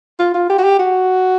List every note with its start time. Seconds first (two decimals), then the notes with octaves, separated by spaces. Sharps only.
0.19 F4
0.34 F4
0.50 G4
0.59 F#4
0.64 G4
0.79 F#4